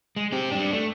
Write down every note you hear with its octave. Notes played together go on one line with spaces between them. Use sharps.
G#3
C4 G4
G3 D4
A3